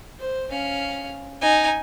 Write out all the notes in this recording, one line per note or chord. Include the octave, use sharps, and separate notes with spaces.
C5
C#4 F5
D#4 G#5